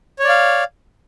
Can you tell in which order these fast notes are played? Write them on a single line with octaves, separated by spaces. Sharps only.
C#5 D5 F5